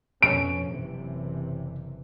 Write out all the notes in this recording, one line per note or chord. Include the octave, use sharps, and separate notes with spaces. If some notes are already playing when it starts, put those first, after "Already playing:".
F2 B2 C#4 D7
F#1 C3 E3